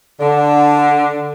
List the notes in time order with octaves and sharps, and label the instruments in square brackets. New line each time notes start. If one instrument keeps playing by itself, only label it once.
[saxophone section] D3